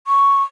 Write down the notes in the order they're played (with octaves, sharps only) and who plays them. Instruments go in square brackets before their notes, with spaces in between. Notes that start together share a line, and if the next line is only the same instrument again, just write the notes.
[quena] C#6